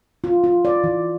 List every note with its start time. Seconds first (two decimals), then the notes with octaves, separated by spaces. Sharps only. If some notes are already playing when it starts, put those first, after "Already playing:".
0.24 F4
0.44 F4
0.65 D5
0.84 E3